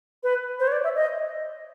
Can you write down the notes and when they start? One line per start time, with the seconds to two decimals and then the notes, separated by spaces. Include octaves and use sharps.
0.23 B4
0.60 C5
0.67 C#5
0.72 D5
0.84 E5
0.96 D#5